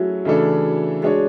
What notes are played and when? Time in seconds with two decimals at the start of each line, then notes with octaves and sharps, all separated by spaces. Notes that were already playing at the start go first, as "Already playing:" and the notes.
Already playing: F#3 A3 C#4 E4 F#4 G#4
0.25 C#3 E3 A3 D4 A4
1.02 G#3 D4 F#4 G#4 C#5